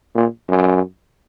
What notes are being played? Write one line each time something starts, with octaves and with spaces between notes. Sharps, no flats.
A#2
F#2